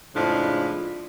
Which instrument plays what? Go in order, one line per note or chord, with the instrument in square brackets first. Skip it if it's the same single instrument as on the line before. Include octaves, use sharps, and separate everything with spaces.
[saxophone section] F2 A2 C#3 F3 G#3 D4